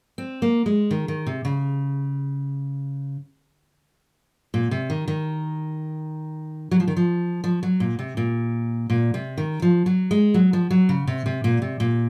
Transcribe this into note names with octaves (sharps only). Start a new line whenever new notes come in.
C4
A#3
G#3
D#3
D#3
C3
C#3
A#2
C3
D#3
D#3
F#3
F3
D#3
F3
F3
F#3
A#2
C3
A#2
A#2
C3
D#3
F3
F#3
G#3
F#3
F3
F#3
C#3
C3
C3
A#2
C3
A#2